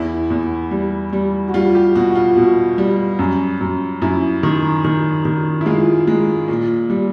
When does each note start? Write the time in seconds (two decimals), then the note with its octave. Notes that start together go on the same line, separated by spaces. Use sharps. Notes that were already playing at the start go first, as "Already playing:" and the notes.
Already playing: E2 E4
0.30 E2
0.71 G3
1.13 G3
1.48 F#4
1.54 G3 F4
1.75 G4
1.95 B2 F#4
2.15 F4
2.37 B2
2.78 G3
3.19 F#2
3.61 F#2
4.02 F#2 E4
4.43 D#3
4.84 D#3
5.25 D#3
5.61 E4
5.66 G#3 F4
6.07 G#3
6.48 A#2
6.90 G3